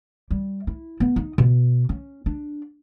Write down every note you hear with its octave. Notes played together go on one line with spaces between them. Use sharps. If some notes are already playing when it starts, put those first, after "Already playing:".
G3
E4
B3
D#4
B2
C#4
D4